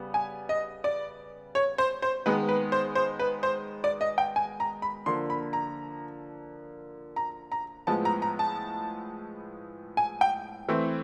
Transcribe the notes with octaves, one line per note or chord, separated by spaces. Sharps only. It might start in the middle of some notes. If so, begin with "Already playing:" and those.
Already playing: C#3 G3 B3
G#5
D#5
D5
C#5
C5
C5
D#3 G#3 B3 B4
B4
C5
C5
B4
C5
D5
D#5
G5
G#5
A#5
B5
D3 F3 A#3 C6
B5
A#5
A#5
A#5
A2 F3 G#3 B3 A5
A#5
A#5
A5
G#5
G5
E3 A3 C4